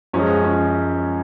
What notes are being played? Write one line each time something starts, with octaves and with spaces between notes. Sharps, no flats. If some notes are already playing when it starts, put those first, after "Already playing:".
F#2 F3 G#3 C#4
C#4